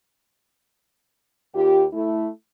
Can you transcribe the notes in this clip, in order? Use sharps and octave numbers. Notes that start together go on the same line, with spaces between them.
D#2 F4 G4
A3 E4